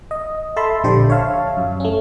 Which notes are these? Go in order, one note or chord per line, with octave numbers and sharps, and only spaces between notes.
D#5
A4 E5 A5 B5 C6
A#1 D3 G4 C5 D5
C#5 E5 F5 A5
F#2
A3 C#4